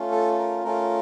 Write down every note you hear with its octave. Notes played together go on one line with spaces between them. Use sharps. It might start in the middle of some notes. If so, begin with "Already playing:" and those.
Already playing: A3 C#4 F4
A4
A#4
A3 C#4 F4 A#4